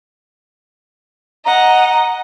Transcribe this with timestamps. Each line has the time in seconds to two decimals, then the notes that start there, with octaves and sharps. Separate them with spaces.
1.45 D#5 F#5 A#5